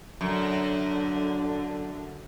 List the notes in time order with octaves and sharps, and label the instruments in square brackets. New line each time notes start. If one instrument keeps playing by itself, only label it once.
[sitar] F#2 [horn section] D3